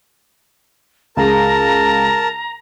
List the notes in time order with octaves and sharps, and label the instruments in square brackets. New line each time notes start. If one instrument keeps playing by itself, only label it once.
[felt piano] C#2 G#3 [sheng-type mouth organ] A#4 A5 [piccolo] A#5